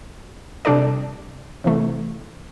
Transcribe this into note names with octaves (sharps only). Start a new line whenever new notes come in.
C3 G3 D4 A4 D5
C3 E3 A3